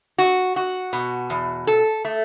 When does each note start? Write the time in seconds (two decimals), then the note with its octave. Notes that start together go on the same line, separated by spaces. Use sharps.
0.18 F#4
0.56 F#4
0.93 B2
1.30 E2
1.67 A4
2.05 A3